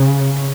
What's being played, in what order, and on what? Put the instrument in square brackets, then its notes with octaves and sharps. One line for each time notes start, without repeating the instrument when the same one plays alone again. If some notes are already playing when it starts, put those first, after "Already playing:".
Already playing: [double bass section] C#3